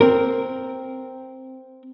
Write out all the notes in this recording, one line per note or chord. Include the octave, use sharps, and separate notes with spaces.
C4 A#4